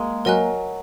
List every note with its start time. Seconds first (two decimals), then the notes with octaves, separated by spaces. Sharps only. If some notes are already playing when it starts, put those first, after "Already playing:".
Already playing: G#3 A#3
0.25 F#3 A#4 D#5 G#5 F#6